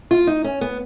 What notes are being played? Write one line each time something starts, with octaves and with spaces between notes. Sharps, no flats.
F4
D#4
C#4
B3